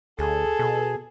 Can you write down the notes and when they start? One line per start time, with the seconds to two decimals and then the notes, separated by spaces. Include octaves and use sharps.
0.19 D2 G#4 A4
0.59 B2